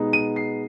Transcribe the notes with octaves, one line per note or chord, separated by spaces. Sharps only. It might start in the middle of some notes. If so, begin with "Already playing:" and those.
Already playing: B2 G#3 B3 D#4
D#7
C7